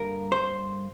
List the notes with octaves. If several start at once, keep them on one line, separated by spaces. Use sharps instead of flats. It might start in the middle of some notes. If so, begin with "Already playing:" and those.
Already playing: G2 D3 G3 A#3 A#4
C5